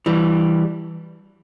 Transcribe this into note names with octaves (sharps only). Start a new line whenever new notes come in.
E3 G3